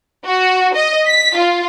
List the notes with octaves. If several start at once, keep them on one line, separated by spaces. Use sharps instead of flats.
F#4
D#5
B6
F4